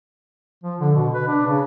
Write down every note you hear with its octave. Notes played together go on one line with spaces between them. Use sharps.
F3
D3
B2
B4
D4
C#3